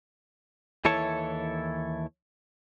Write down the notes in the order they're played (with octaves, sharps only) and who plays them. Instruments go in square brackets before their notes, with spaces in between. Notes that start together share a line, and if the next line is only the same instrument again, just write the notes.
[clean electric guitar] D#2 E3 E4 A4 C#5 A5